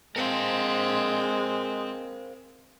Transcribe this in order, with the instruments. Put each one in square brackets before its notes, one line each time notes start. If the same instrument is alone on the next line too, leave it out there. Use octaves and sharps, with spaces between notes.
[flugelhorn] G#3 [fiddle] C4 [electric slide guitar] A#4 C5 F5